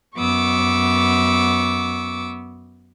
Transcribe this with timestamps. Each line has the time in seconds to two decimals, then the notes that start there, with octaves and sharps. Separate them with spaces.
0.17 F#2 B3 C#6 D6 E6